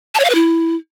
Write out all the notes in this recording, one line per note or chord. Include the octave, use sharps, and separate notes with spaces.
A5
C#5
F5
B4
E4